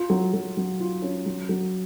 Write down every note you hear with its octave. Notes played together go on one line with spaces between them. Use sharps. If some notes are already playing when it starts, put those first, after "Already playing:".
Already playing: F4
F#3
F#3
F#3
F4
C#4
F#3
F#3